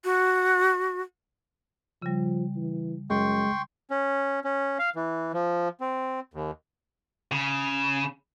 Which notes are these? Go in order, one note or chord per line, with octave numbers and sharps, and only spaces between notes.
F#4
C#3 F3 G3
E3
F#2 G#3 G5 C6 C#6
C#4
C#4
F5
E3
F3
C4
D#2
C#3